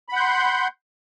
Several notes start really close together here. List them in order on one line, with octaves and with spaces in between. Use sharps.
B5 F#5 G6 C6